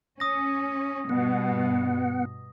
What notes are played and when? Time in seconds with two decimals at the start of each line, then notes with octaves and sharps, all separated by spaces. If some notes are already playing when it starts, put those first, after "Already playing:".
0.20 C#4 D#6 A#6
1.09 G2 B2 B3 F#5